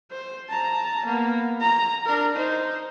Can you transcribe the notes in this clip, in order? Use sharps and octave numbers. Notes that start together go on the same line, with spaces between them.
C5
A5 A#5
A#3 B3
A#5
D4 A#4
D#4 C5